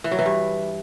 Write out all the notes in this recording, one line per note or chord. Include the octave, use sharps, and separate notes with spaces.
E3
F#3
E3
G2